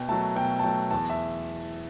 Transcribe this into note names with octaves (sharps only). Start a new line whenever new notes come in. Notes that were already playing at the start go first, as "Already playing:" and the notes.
Already playing: B2 G5
F#3 A3 A5
B2 G5
A5
F#3 A3 G5
E2 A5
E5